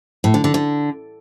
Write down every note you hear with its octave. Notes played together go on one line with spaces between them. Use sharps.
A2
D3
D3
D3